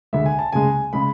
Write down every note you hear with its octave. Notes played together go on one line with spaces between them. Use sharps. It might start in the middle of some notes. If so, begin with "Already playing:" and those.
D2 D3 G#3 E5
G#5
A5
C#2 C#3 G#3 G#5
C#3 G#3 B5